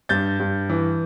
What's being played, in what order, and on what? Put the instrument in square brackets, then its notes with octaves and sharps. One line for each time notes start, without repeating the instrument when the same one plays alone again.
[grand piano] G2 G6 A6
G2
E3